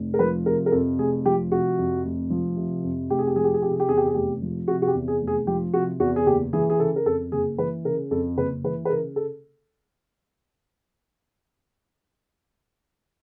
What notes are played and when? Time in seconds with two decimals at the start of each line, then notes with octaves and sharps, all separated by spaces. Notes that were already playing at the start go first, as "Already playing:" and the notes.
Already playing: F1
0.14 A#4
0.19 F3 B4
0.46 C3 A#4
0.66 A#4
0.72 F2 A4
0.99 F1 G#4
1.26 F3 G4
1.51 C3 F#4
1.79 F2
2.05 F1
2.30 F3
2.57 C3
2.84 F2
3.10 F1 G4
3.19 G#4
3.27 G4
3.36 F3 G#4
3.44 G4
3.54 G#4
3.62 C3 G4
3.72 G#4
3.80 G4
3.89 E2 G#4
3.97 G4
4.06 G#4
4.14 F1 G4
4.42 F3
4.68 C3 F#4
4.82 F#4
4.87 G4
4.94 E2
5.08 G#4
5.21 F1
5.27 G#4
5.47 F3 G4
5.73 C3 F#4
6.00 E2 F#4
6.16 G#4
6.26 F#1 G4
6.53 E3 G#4
6.70 G#4
6.79 C#3 A4
6.96 A#4
7.06 F2 A4
7.32 F#1 G#4
7.58 E3 B4
7.84 C#3 A#4
8.11 F2 A4
8.37 F#1 B4
8.64 E3 B4
8.85 B4
8.90 C#3 A#4
9.16 A4